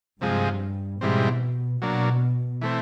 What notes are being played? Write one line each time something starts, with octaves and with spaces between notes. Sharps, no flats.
G2 C3 F3 G#3
G#2 B2 E3 G3 C4
B2 F#3 A#3 D4
E3 A3 C4